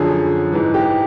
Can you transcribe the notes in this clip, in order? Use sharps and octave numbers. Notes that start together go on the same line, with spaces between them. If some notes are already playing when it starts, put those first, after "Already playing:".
Already playing: F#2 D3 F3 G#4
G#2 E3
G4